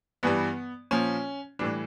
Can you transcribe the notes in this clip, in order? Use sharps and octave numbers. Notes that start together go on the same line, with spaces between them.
G2 E3 G3 B3
A#2 F3 C#4
A2 E3 G3 D4